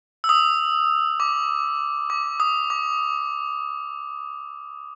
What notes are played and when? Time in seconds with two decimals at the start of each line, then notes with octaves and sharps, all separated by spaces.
0.24 E6
0.29 D#6
1.20 D6
2.10 D6
2.40 D#6
2.70 D6